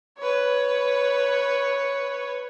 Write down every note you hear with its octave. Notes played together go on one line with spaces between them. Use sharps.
B4 C#5